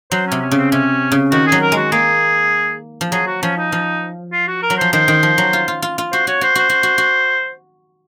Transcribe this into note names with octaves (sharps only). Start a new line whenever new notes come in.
F#3 C5
C#4
C3
C#4
C#3
C4
C3 C#4
C#3
D#3 F#4
G#4
F#3
A#4
G#3
F#4
A#3 G#4
F3
F#3 G#4
F#4
F3 C#4
D#4
F3
F4
F#4
A#4
F#3
F3 C5
D#3 C5
D#3
F3
F#3
F4
F4
F4
F4
F#4 C5
F#4 C#5
F#4 C5
F#4 C5
F#4
F#4
F#4